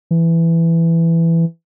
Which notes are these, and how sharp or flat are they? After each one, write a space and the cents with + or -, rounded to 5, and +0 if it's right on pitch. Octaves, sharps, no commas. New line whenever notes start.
E3 +10